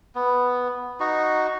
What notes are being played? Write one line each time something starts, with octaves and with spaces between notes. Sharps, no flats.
B3
D#4 F#4